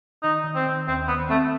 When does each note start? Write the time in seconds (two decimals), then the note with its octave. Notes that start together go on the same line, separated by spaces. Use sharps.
0.23 D#3 D#4
0.44 D#3
0.55 C4
0.66 D#3
0.88 D#2 C4
1.08 D#3 B3
1.29 A3 C4